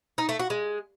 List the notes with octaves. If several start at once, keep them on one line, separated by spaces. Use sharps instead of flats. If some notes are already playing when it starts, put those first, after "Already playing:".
D#4
A3
F#4
G#3